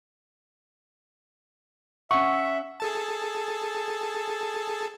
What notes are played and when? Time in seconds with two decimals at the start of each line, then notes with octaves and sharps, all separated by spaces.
2.11 C#4 E5 F#5 C#6
2.80 G#4 A4 A5